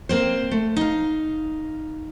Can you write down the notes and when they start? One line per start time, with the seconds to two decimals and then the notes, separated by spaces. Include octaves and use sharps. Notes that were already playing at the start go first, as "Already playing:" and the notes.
0.09 A#3 C4 C5
0.51 A3
0.77 D#4 F5